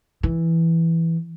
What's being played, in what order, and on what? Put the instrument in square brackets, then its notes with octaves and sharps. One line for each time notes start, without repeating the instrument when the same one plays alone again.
[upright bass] E3